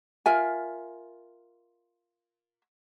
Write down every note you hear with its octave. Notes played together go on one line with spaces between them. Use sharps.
F4 A#4 E5 G#5